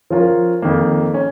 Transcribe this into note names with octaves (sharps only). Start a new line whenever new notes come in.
F3 C#4 F4 A#4
F2 D#3 A#3
C#4